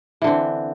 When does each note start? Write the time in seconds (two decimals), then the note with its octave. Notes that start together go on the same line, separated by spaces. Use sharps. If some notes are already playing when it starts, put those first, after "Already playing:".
0.22 E3
0.24 D3
0.27 C4